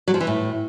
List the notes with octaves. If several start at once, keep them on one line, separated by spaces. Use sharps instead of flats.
F#3
F3
E3
A2